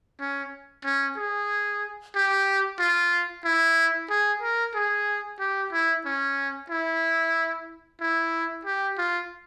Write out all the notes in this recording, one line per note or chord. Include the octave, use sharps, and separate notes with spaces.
C#4
C#4
G#4
G4
F4
E4
G#4
A#4
G#4
G4
E4
C#4
E4
E4
G4
F4